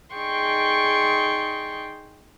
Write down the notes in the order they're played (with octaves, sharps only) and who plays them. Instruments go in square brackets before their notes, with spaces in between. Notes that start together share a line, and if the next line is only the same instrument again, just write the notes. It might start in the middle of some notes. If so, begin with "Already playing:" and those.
[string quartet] D#4 G#4 D5 G5 C6 C#6